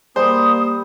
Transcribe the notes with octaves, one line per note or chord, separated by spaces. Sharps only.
G3 A#3 C5 D#6